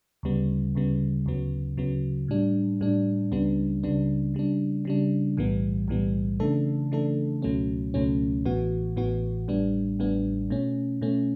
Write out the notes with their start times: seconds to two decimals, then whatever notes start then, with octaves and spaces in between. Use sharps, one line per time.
0.23 D2 C#3 G3 B3
0.75 D2 C#3 G3 B3
1.26 D2 C#3 F#3 B3
1.77 D2 C#3 F#3 B3
2.28 A2 G3 D4
2.81 A2 G3 D4
3.32 C#2 C#3 G3 B3 D4
3.83 C#2 C#3 G3 B3 D4
4.34 C#3 G3 D4
4.85 C#3 G3 D4
5.37 B1 A2 E3 G3 B3
5.88 B1 A2 E3 G3 B3
6.40 C#3 E3 A3 D4 A4
6.92 C#3 E3 A3 D4 A4
7.42 C#2 B2 F#3 A3 C#4
7.94 C#2 B2 F#3 A3 C#4
8.45 A1 A2 E3 B3 F#4
8.96 A1 A2 E3 B3 F#4
9.48 A1 A2 G3 B3 D4
9.99 A1 A2 G3 B3 D4
10.50 B2 A3 C#4
11.02 B2 A3 C#4